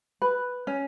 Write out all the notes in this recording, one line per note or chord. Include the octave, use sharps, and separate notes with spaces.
B4
C#4